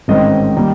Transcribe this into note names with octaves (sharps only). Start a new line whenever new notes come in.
A1 G#2 D#3 G#3 C4 D#5
D#3 G3 A#3